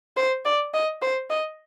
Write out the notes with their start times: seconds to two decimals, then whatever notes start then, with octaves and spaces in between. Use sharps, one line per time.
0.17 C5
0.45 D5
0.74 D#5
1.02 C5
1.30 D#5